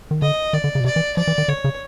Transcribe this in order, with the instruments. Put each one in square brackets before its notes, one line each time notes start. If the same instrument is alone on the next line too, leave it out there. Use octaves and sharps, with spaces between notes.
[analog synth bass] D#3
[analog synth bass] D3 [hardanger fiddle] D#5
[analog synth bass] D#3 [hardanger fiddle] D5
[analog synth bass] D3
C#3
B2
[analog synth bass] C3 [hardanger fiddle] D5
[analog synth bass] E3
[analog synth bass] F3 [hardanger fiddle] D5
[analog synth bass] E3
D#3
[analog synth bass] D3 [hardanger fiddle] C#5
[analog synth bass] C#3